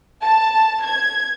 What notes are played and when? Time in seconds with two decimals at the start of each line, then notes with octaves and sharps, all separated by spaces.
0.23 A5
0.85 G#6